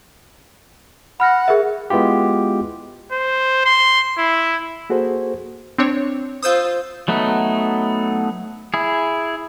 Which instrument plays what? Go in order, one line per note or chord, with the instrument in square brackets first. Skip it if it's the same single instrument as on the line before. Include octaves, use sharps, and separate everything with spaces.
[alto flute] F#5 [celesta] B5 F6 A#6
[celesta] G#4 A#4 E5
[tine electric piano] G#3 B3 E4 F4 G4
[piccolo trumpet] C5
C6
E4
[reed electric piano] A#3 F#4 G#4 A4 C5
[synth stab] C4 D4 C#5
[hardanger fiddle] F4 C5 [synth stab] D#6 E6 G6
[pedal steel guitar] F#3 A3 B3 D#4
E4 G#4